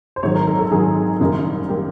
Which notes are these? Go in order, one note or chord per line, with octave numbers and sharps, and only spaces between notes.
C5
G#1 G#2 D#3 F#3 C#5
A#4
A4
A4
G#1 G#2 D#3 F#3 G#4
F#1 F#2 D#3 G3 A#3
D#3 G3 A#3 G4